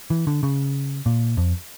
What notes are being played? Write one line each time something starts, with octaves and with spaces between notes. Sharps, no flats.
E3
D3
C#3
A#2
F2